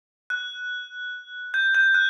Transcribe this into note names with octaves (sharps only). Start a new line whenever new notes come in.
F#6
G6
G6
F#6